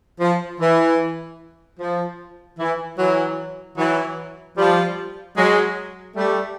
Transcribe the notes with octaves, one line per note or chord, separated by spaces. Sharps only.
F3
E3
F3
E3
E3 F#3
E3 F#3
F3 G3
F#3 G#3
G3 A3